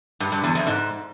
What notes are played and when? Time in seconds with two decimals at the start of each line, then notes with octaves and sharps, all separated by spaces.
0.20 G2
0.32 G2
0.44 E2
0.55 F2
0.67 G#2